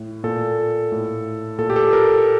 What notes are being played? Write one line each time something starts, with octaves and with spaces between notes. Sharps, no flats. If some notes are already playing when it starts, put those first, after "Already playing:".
Already playing: A2
A#2 A4
A2
A#2 A4
G4
A4
A#4